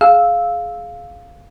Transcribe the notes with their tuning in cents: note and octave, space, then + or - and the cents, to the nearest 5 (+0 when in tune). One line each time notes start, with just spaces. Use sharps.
G#4 +20 F5 +0 E6 -10